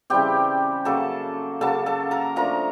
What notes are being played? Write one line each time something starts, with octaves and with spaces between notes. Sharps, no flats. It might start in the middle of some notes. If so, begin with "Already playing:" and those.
C#3 E3 G3 C4 G4 G5
C#3 F#3 A#3 A4 A5
C#3 F#3 A#3 A4 A5
A4 A5
A#4 A#5
F3 A3 D4 A#4 A#5